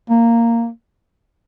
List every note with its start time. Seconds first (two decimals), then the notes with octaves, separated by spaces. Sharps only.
0.10 A#3